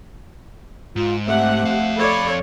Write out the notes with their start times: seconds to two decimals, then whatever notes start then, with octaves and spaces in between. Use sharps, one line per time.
0.96 G#2 F4
1.27 A3 C4 G4 E5 F#5
1.65 F2 F5
1.97 A4 C#5 D5 B5